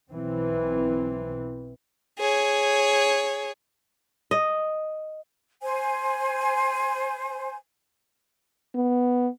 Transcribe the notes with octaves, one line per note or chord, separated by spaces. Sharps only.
B1 E3 C4
G#4 C#5
D#5
C5 G#5
B3